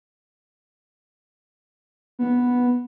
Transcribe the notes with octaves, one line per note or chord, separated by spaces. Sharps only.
B3